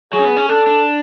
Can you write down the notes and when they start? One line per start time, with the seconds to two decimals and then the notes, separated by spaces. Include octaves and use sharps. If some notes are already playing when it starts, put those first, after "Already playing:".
0.13 F#3 G#4
0.19 C#4
0.24 B3
0.37 C#4
0.49 D4 A4
0.67 D4